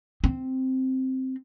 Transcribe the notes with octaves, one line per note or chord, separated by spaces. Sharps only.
C4